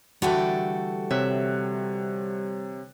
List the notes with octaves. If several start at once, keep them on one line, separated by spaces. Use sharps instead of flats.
D3 E3 G3 A3 F#4 A4 G5
C3 C#5 E5 F#6